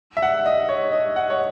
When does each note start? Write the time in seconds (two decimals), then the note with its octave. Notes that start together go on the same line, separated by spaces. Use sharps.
0.17 E5
0.22 F#5
0.46 D#5
0.69 C#5
0.92 D#5
1.16 F#5
1.30 C#5